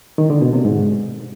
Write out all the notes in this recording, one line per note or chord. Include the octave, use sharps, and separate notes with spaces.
D#3
D3
B2
C3
G#2